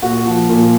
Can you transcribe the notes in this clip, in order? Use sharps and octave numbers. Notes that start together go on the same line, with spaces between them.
A#2 F#4
F3
A#2